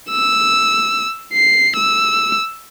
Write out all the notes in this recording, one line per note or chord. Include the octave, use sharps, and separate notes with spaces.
E6
C7
E6